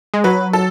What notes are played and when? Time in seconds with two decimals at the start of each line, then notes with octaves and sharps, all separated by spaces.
0.14 G#3
0.24 F#3 B4
0.53 A4